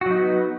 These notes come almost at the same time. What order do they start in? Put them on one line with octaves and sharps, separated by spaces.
F#4 F#3 D#4 B3